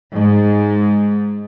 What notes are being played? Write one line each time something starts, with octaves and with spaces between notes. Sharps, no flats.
G#2